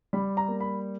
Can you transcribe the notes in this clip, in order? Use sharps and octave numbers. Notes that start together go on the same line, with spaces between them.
G3 B5
A#5
A#3
B5